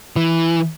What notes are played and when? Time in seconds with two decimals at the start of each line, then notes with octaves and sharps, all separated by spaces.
0.16 E3